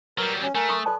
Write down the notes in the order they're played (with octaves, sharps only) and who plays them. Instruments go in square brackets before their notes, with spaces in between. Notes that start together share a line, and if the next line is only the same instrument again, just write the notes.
[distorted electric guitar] F#3 G3 [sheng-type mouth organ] A#4 F6 [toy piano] B4
[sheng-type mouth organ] C#4
[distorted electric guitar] A3 [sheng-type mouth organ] A#4 [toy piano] G#5
[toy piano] C6 C#6 D#6
[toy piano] A4 D5 A5 [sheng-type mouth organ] B4